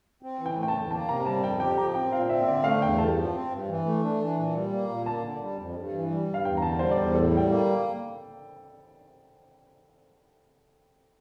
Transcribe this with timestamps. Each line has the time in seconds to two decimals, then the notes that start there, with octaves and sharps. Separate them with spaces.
0.23 C4
0.39 E3
0.46 G5
0.56 A3
0.63 G5
0.68 A5
0.73 E2
0.91 A#3 A5
1.08 C3 A#5
1.20 A#5
1.26 G3 A5
1.43 F2 G5
1.60 G4 G5
1.77 F3 A#5
1.94 C4 G5
2.12 A#2 F5
2.29 C4 E5
2.43 E5
2.47 D3 D5
2.64 A3 F5
2.81 E2 G5
2.98 G2 A5
3.16 F3
3.33 C4
3.50 G2
3.68 E3
3.85 A3
4.02 D4
4.20 E3
4.37 A#2
4.55 G3
4.72 A#3
4.89 A#2
5.06 A#3 A5
5.23 D3
5.41 G3
5.59 F2
5.75 G2
5.93 E3
6.10 G3
6.28 G2
6.34 F5
6.44 E2 G5
6.57 A#5
6.62 D3 A5
6.79 G3 C5
6.91 D5
6.97 E2 C5
7.14 A2 A4
7.31 G3
7.37 G5
7.49 A#3